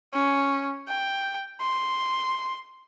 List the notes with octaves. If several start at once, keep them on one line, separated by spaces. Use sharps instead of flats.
C#4
G5
C6